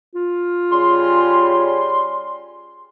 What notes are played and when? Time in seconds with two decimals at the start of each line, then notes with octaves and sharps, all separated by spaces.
0.15 F4
0.71 C#3 G3 C6